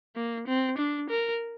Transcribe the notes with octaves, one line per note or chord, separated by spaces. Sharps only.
A#3
C4
D4
A#4